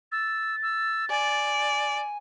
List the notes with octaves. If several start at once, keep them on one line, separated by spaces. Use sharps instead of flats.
E6 A6
E6
D5 G#5